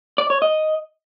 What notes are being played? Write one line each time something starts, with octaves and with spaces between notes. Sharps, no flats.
D5
C#5
D#5